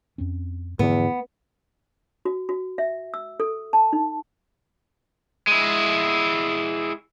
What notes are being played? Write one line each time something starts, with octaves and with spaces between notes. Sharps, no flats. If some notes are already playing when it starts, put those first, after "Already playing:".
F2 C4 C#4
E2 G#2 D3 F3 B3
F#4
F#4
E5
E6
A4
A5
D#4
G#3 E4